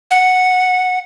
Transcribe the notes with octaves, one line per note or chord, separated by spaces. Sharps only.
F#5